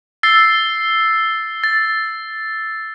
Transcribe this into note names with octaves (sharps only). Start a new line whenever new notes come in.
E6 A6 C7
A6